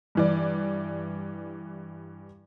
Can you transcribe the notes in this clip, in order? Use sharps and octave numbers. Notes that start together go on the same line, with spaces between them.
G2 E3 D5